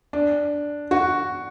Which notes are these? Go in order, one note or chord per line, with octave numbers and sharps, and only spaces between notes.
D4
F#4